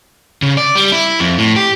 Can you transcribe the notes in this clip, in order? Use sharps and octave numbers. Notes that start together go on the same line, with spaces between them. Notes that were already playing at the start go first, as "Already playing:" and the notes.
C#3
D5
G3
E4
F2
A2
G4